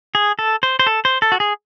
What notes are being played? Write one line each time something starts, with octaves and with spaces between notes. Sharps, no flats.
G#4
A4
C5
C5
A4
C5
A4
F#4
G#4